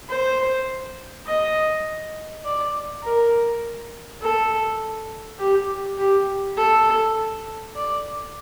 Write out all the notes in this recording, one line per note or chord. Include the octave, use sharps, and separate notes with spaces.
C5
D#5
D5
A#4
A4
G4
G4
A4
D5